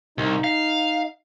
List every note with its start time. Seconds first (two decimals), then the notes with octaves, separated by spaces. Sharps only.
0.18 C2 D#4
0.44 F5